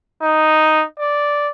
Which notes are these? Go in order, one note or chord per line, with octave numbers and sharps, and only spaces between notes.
D#4
D5